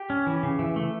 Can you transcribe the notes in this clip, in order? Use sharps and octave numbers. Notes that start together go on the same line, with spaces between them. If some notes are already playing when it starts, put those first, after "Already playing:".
Already playing: G4
C#4
E3
C#3
E3
A3